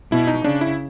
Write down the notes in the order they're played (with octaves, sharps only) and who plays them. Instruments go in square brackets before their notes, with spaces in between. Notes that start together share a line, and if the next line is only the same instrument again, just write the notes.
[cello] B2 [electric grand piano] E4
[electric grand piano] D#4
[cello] C#3 [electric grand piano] D4
[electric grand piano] E4